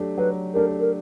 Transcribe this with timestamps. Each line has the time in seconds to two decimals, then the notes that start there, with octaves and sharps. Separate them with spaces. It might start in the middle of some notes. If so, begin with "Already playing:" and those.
Already playing: F#3 A3 D4 G4
0.18 F#3 B4
0.54 A3 D4 G4 A#4
0.80 A#4